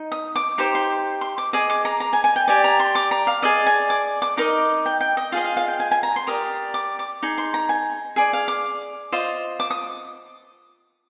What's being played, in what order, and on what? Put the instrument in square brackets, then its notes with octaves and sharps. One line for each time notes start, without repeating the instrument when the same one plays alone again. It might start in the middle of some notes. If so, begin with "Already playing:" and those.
Already playing: [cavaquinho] D#4 D#5
D#6
D6
D#4 G4 C5 C6
C6
C6
D6
G#4 D#5 D6
D6
A#5
A#5
G#5
G#5
G5
G4 D5 G#5
A#5
C6
D6
A#5
F5
G#4 D5 D#5
G#5
D6
D6
D#4 A#4 D#5 D6
G5
G5
D#5
F4 G#4 D#5 F5
F5
F5
G5
G#5
G#5
A#5
C6
G4 A#4 D5 D#6
D6
D6
D#4 G#4
C6
A#5
G#5
G#4 D5 G#5
F5
D6
F4 C5 D#5
D6
D#6